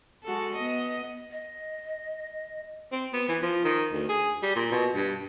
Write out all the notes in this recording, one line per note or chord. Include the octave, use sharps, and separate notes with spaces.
G#3 F#4 A4
B3 D#5
D#5
C4
B3
E3
F3
D#3
D2
G#4
G3
A#2
B2
G2